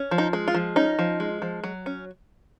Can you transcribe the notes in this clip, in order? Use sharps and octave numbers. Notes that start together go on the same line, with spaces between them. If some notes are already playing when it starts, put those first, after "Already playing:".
Already playing: C#4
F3
D#4
G#3
F4
F3
C#4 D#4
F3
G#3
F3
F#3
C#4